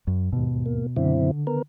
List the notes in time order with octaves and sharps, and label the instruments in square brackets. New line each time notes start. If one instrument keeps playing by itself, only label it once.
[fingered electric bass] F#2
[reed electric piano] D#2 G#2 [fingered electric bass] B2
[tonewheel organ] A#3
[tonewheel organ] F#2 C4 E4 [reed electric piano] D3
[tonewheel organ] B3 A#4